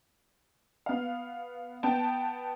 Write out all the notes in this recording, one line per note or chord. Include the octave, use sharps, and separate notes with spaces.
B3 F5
B3 G5 A5